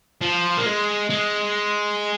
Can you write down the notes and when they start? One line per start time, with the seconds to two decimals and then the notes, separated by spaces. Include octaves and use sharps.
0.22 F3
0.58 A#3
0.66 G#3
1.10 G#3